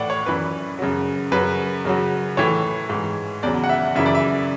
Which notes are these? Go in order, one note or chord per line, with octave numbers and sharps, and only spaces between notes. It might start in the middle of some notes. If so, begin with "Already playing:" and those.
Already playing: A2 E3 D5 F#5
C#5
F#2 E3 B4
F#2 C#3 F#3
F#2 C#3 F#3 B4
F#2 C#3 F#3
A2 E3 C#5
G#2 E3
E2 C#3 F#3 D5
F#5
E5
F#2 C#3 E3 E5
D5
E5